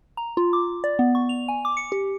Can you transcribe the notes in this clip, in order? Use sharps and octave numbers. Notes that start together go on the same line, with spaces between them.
A#5
F4
D6
D5
B3
C#6
F7
G#5
D6
C#7
G4